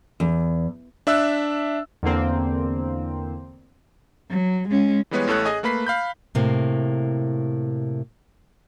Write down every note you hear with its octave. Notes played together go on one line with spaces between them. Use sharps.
E2
D4 E5 E6 F#6
E2 D3 A#3 C4
F#3
G#3 C#4
E3 G3 G#3 B3 B4 C#5
A1 A2 A4 C#5 F#6
G#4 D#5 G#5
A3 A#3 B4 B5 B6 C7
F5 B5 G6
A2 C3 A#3